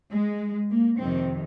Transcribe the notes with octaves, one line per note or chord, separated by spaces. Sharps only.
G#3
A#3
F2 C3 D#3 C4